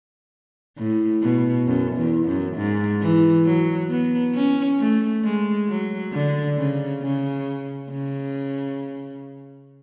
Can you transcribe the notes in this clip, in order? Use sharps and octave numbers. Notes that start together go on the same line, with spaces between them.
A2
B2
F#2
E2
F#2
G#2
E3
F#3
B3
C#4
A3
G#3
F#3
D3
C#3
C#3
C#3